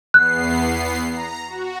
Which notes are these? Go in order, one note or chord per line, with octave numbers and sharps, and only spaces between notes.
E2 B3 F#6 C7
A#5
F#4